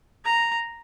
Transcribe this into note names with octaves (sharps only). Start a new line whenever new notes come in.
A#5